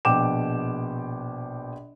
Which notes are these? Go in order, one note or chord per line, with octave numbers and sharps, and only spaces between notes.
A#1 B2 G5 D6 E7